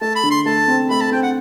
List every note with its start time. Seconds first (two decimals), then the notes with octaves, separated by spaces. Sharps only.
0.01 A3 A5
0.15 B5
0.23 D3
0.31 C6
0.46 A3 A5
0.68 C4
0.90 A3 B5
1.01 A5
1.12 C4 G5
1.23 F#5